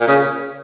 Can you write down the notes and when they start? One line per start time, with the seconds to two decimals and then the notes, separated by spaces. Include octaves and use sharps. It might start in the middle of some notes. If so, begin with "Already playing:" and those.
0.01 A#2
0.08 C#3